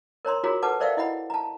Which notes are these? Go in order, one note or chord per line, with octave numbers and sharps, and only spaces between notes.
A#4 C#5 A#5 C6
F4 F#4 G#4 A#4 C#5 A#5
A4 B4 F#5 A5 D6
A#4 C5 D5 E5 F5 G5
E4 D#5 F#5 B5
A5 A#5